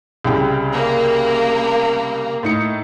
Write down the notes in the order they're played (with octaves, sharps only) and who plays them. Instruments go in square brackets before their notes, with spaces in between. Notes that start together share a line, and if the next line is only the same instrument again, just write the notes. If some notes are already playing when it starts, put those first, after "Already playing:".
[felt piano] C2 C#3 G5
[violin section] A#3
[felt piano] A2 D#4 C#7